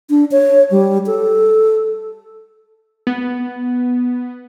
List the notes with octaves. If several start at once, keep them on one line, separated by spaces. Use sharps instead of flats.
D4
C#5
G3
A4
B3